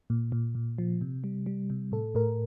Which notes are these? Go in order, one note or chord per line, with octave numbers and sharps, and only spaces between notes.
A#2
A#2
A#2
F3
C3
G3
G3
C3
A2 A4
A2 A#4